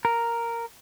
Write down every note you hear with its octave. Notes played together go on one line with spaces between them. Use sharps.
A#4